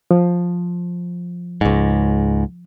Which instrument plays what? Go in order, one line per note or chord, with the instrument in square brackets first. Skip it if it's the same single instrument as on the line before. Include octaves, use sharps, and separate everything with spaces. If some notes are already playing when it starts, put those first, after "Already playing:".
[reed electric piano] F3
[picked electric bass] C#2 G#2